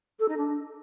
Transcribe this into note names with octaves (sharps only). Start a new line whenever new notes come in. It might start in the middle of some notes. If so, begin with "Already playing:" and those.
A4
D#4
D4